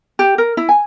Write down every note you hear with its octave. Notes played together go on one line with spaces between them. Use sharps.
G4
A#4
E4
G#5